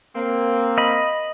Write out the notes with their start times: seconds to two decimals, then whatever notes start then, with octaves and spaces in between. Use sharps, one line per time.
0.16 A#3 C4
0.78 D#5 B5